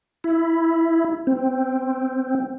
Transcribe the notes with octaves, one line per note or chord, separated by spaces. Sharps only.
E4
C4